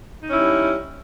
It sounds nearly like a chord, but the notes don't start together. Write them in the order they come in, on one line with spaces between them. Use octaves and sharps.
D#4 C#4 E4 G3